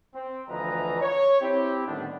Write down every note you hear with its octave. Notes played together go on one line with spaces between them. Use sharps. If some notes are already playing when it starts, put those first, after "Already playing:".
C4
D2 E3 F3 B4 D#5 A#5
C#5
C4 E4 G4
A2 D3 D#3 G3 B3 D4